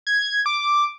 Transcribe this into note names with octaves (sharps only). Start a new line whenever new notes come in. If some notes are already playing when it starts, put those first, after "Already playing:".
G#6
D6